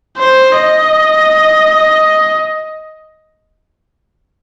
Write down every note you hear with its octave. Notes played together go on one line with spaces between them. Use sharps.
C5
D#5